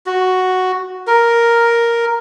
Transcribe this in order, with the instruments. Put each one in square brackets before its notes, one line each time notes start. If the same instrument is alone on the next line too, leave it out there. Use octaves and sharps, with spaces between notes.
[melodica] F#4
A#4